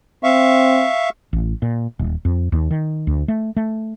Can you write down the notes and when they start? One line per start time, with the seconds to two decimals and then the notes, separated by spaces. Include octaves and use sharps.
0.24 C4 E5 F5 C#6
1.33 A1
1.62 A#2
1.99 D#1
2.25 F2
2.52 D#2
2.71 D#3
3.07 D2
3.28 A3
3.57 A3